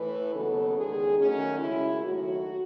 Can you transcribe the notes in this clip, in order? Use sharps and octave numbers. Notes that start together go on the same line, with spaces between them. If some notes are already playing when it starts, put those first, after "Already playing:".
Already playing: A2 E3 A3 B4
D#2 C#3 F#3 B3 A4
E2 D#3 G#3 G#4
F#2 D#3 F#3 A3 C#4
F#2 C#3 G#3 E4
D#2 D#3 F#3 A3 F#4